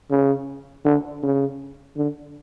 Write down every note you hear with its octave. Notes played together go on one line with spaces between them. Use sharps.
C#3
D3
C#3
D3